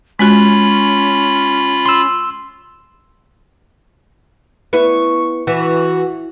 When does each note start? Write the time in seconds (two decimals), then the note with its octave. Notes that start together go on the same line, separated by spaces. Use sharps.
0.19 G#3 C#4 F4 F#4 B5
1.86 C6 E6
4.73 B3 E4 C#6
5.47 E3 F#4